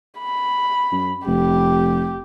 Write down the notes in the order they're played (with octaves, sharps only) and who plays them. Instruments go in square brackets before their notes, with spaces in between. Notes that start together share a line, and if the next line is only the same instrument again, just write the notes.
[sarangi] B5
[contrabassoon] F#2
[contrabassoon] F1 [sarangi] G4